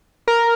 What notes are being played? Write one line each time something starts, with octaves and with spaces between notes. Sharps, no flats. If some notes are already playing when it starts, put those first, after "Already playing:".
A#4